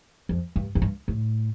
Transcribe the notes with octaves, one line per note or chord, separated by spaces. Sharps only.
F2
G2
F2
G2
A2